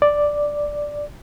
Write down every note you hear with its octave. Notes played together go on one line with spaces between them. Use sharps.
D5